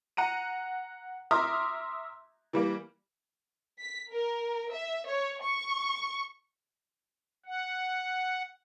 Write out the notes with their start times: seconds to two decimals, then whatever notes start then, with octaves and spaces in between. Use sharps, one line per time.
0.17 F#5 A#5 D#7
1.31 E5 A#5 C6 D6 D#6 F6
2.53 E3 G3 A#3
3.79 B6
4.11 A#4
4.71 E5
5.07 C#5
5.42 C#6
7.46 F#5